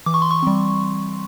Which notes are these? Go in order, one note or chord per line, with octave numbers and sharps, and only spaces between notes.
E3 D6
C#6
C6
C#6
G3 C4